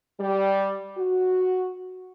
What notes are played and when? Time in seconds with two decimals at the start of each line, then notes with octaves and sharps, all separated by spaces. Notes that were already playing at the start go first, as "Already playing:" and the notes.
0.20 G3
0.98 F#4